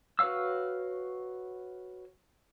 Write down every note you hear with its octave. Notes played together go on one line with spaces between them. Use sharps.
F#4 B4 C#5 F5 E6